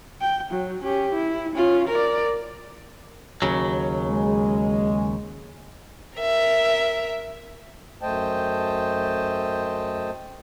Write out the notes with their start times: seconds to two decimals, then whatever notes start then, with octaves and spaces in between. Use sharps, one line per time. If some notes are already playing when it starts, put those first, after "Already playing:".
0.21 G5
0.51 F#3
0.83 C#4 G4
1.14 E4
1.55 C#4 F4
1.88 A#4 D5
3.42 D#2 C#3 F#3
4.09 G#3
6.19 A#4 E5
8.01 F#2 A3 C5 D#5 G5 A5